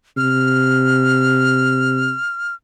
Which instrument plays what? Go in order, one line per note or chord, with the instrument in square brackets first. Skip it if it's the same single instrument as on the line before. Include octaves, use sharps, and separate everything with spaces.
[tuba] C3 [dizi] F6